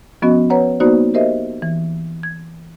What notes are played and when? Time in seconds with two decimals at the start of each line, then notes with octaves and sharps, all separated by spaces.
0.22 F3 B3 C#4 F#4 D#5
0.50 B4 C#5 F#5 A#5
0.80 A#3 B3 D#4 F#4 C5 D5
1.14 G4 A#4 C5 D#5 E5
1.62 E3
2.23 G#6